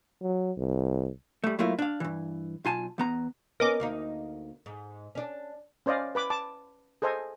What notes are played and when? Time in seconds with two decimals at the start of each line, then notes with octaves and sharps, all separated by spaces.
0.22 F#3
0.57 C2
1.44 G3 A3
1.59 F#3 A3 A#3 E4 F4
1.79 D4 F5
2.00 G2 E3
2.65 B1 F4 G#5 A5
2.98 E2 B3 A#5
3.60 B3 C#4 A#4 D#5 D6
3.80 D2 A#3 D#4
4.66 G#2
5.15 C#4 D4
5.86 C#4 C5 D5 D#5 F5
6.15 B4 B5 D6
6.30 A5 D6
7.02 G#4 A4 C5 D#5 G#5